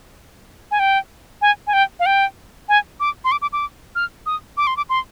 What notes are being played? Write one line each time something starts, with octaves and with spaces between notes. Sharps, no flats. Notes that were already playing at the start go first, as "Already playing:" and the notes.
G#5
G5
G#5
G#5
G5
F5
G5
G#5
D6
C6
D6
D6
D6
F6
D#6
D6
C6
D6
C6